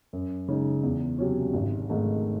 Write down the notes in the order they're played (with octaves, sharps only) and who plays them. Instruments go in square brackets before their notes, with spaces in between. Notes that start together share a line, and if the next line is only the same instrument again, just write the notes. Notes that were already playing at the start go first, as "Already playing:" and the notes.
[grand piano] F#2
C#3 G#3 D#4
E2
C3 F#3 C#4
G#1
G#2 D#3 A3